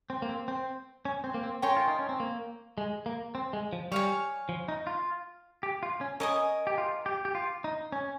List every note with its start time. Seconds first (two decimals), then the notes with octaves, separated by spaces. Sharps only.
0.10 C4
0.22 A#3
0.29 C4
0.48 C4
1.05 C#4
1.24 C4
1.34 A#3
1.43 C4
1.62 C#4 A#4 C#5 G5 C6
1.77 F4
1.88 D#4
1.99 C#4
2.09 C4
2.20 A#3
2.78 G#3
3.06 A#3
3.35 C4
3.53 G#3
3.73 F3
3.92 G3 C#5 F5 G#5
4.49 F3
4.68 D#4
4.87 F4
5.63 G4
5.83 F4
6.01 C#4
6.20 C#4 A#4 D#5 G#5 D#6
6.67 G4
6.78 F4
7.06 G4
7.25 G4
7.35 F4
7.64 D#4
7.92 C#4